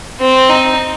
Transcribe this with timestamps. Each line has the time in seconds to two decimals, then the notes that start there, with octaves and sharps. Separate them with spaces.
0.20 C4
0.50 D#4